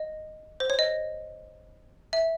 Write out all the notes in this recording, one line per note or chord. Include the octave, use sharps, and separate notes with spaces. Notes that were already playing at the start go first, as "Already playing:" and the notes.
Already playing: D#5
C5
C#5
D#5
E5